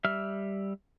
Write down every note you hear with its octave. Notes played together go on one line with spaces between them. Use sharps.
G3 E5 E6 F6